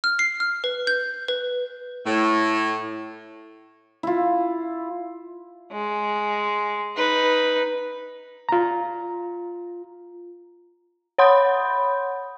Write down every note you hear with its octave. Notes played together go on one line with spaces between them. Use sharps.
F6
C7
F6
B4
G6
B4
A2
E4 F4
G#3
D#4 B4
F4 A#5
C#5 F#5 B5 C6 D#6 G6